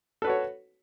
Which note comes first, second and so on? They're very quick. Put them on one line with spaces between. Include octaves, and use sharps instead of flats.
A4 B4 F#4 C#5